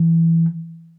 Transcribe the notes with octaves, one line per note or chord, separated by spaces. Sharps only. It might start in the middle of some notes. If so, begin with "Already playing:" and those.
Already playing: E3